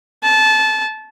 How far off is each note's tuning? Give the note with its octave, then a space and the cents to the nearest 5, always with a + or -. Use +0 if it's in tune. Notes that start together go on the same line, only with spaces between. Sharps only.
A5 -20